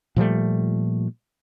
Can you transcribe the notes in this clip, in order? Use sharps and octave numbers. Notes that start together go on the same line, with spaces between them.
A#2 F3 G3 A3